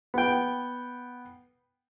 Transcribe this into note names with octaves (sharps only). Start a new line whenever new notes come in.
B3 G5